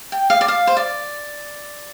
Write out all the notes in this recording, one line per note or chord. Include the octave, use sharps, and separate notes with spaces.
G5
F5
D5
F5
C5
D5